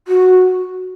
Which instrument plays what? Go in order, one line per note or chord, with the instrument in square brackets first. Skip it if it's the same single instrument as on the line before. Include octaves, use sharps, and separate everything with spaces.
[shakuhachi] F#4